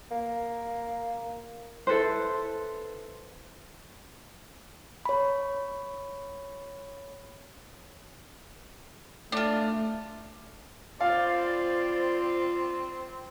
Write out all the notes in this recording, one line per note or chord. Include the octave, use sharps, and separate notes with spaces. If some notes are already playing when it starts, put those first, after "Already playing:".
A#3
E4 A4 B4 C5
C#5 B5
A3 D4 F4
C4 F4 C5 D5 F5